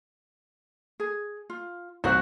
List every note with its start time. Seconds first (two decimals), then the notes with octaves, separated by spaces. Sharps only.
1.00 G#4
1.50 F4
2.04 C2 F#4 C5 F#6